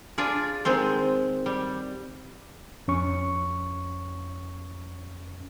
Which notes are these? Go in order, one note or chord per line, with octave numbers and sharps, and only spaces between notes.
D4 F4 G#4
D#3 G#3 C4 C5
G3
F2 C#4 C#6